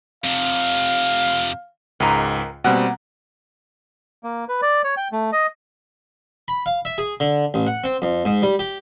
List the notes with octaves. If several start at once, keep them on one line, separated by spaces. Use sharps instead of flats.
F2 C3 F5
C#2 G#2 A#4 G#5 A#5
B2 G3 A#3 C4 F#5
A#3
B4
D5
C#5
G5
A3
D#5
B5
F5
E5
G#4
D3
A1
F#5
C4
F2
G#2
G3
G4